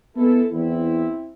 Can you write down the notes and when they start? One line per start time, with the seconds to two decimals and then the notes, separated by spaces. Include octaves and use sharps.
0.16 G#3 B3 E4 A4
0.51 E2 C4 E4